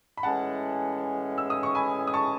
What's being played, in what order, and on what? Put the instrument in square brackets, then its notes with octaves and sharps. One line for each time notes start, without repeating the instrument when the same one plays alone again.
[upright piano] B5
[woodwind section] A2 E3 G#3 C#4 [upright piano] F#5 A5
[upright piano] E6
D#6
C#6
G#5 B5
D#6
A5 C#6